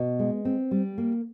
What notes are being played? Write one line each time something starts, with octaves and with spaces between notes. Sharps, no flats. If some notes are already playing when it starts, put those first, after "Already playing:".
Already playing: B2
G#3
C4
G3
A#3